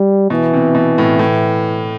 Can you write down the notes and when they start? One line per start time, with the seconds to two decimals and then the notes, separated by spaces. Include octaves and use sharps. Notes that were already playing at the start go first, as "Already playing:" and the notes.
Already playing: G3
0.30 B2 E3
0.53 C3
0.75 B2
0.98 A2
1.19 A2